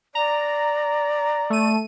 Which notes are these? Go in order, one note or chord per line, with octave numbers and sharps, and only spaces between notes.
D5 A#5
A3 D#7